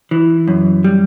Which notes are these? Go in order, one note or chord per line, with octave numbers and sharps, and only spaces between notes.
E3
F#2
G3